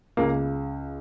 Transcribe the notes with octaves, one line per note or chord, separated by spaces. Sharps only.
C#2 C#3 A#3